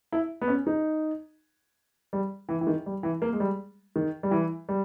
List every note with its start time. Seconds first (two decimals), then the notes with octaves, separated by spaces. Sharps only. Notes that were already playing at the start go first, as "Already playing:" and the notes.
0.12 E4
0.41 B3
0.48 C#4
0.67 D#4
2.13 G3
2.49 E3
2.61 E3
2.67 D#3
2.86 G3
3.03 E3
3.22 A#3
3.33 G#3
3.40 G3
3.96 D#3
4.23 G3
4.31 E3
4.69 G3